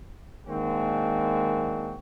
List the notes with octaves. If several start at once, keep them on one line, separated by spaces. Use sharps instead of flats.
D#3 G#3 A#3 C4 D4 F#4